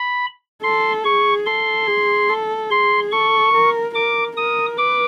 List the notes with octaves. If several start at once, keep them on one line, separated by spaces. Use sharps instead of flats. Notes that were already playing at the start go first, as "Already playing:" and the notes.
Already playing: B5
A4 C6
G#4 C#6
A4 C6
G#4
A4
G#4 C6
A4 C#6
A#4
A#4 D6
A#4 D#6
B4 D6